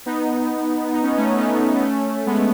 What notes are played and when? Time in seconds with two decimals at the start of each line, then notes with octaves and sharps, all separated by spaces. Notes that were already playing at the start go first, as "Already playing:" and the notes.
0.06 B3 D#4
0.94 D#4
1.02 C#4
1.09 B3
1.17 A3 C#4
1.38 B3 D#4
1.82 A3 C#4
2.26 G#3 B3